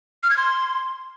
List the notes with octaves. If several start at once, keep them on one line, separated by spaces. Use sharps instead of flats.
F6
G#6
C6